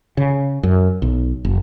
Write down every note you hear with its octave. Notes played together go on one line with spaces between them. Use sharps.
C#3
F#2
B1
F#1